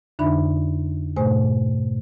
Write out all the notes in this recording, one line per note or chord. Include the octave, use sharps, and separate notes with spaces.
F2 D3 D4 D#4 E5 B5
G#2 B2 A3 C5 G#5